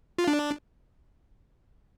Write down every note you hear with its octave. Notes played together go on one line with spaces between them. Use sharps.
F4
D4